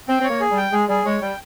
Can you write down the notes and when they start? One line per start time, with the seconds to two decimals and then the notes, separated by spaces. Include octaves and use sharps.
0.08 C4 G5
0.20 C4 C#5
0.30 A#3
0.41 G#4
0.51 G3
0.57 G5
0.72 G#3 G#4
0.88 G3 G#4
1.05 G#3 C#5
1.22 G3 G5